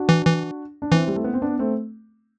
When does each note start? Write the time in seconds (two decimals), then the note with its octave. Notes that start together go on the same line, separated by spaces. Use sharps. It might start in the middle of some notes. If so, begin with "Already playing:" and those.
Already playing: D4 F#4
0.09 E3
0.25 E3
0.82 D4
0.92 E3 C4 E4
1.08 G3
1.16 A3
1.24 B3
1.33 C4
1.42 B3 D4
1.59 A3 C4